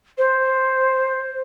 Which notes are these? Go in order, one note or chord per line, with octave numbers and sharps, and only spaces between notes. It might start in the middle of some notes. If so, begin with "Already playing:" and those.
C5